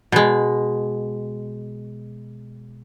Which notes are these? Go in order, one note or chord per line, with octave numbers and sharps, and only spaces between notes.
B2 G#3